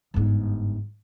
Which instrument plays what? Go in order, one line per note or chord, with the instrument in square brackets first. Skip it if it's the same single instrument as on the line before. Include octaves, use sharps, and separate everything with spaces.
[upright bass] G1 G#2